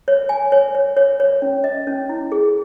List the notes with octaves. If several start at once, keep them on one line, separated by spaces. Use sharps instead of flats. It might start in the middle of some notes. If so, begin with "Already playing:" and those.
C#5
G#5
C#5
C#5
C#5
C#5
C#4
D#5
C#4
E4
G#4